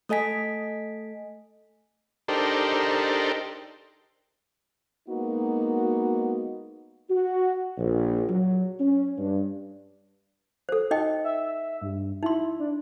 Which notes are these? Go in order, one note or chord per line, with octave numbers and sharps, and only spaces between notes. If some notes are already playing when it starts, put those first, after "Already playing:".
A3 A4 D#5 G#5 B6
D4 D#4 G4 A4 A#4 C5
G#3 A#3 B3 D#4 F#4
F#4
A#1
F#3
C#4
G2
A4 C5
D#4 D#5 G5
E5
G2
D#4 E4 C6
D4